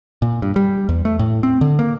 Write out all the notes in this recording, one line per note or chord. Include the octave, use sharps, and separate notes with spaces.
A#2
G2
G3
E2
A3
A2
C4
D3
A#3